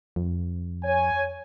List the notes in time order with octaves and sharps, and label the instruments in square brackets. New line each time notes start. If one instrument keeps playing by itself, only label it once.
[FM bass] F2
[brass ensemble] C#5 G#5